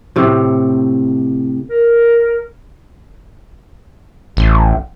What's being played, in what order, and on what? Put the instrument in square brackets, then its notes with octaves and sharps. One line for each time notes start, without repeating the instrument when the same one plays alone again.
[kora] A2 C3
[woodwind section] A#4
[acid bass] A1